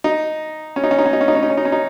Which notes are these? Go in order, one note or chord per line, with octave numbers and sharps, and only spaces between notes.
D#4
C#4
D#4
C#4
D#4
C#4
D#4
C#4
D#4
C#4
D#4
C#4
D#4
C#4
D#4